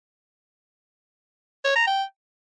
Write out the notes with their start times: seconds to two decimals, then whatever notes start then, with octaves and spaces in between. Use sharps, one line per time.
1.65 C#5
1.76 A#5
1.87 G5